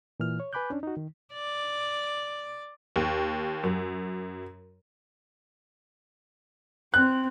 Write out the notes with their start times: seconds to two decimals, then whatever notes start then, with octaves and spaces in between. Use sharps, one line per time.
0.20 A#2 E3 F6
0.40 C#5
0.53 B4 G#5 B5 D6 F#6 G6
0.70 C#4 D4
0.83 D#4 F#4
0.97 D#3
1.33 D5
2.96 D#2
3.63 F#2
6.94 C4 F#6